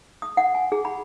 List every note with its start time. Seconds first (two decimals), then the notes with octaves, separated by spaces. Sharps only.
0.22 D#6
0.37 F#5
0.55 G#5
0.72 G#4
0.85 B5